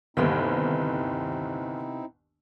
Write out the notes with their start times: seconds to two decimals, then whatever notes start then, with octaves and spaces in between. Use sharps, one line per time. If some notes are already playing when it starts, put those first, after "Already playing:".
0.17 G1 D#2 C3 B3 C4 D#4 E4 G5